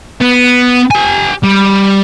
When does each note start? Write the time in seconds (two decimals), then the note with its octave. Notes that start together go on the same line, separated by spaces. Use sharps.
0.21 B3
0.91 G4 G#5
1.43 G3